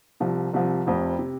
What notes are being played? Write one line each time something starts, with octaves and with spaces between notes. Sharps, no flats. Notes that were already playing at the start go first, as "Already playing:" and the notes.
C2 C3 F3
C2 C3 F3
F1 F2 C3
C3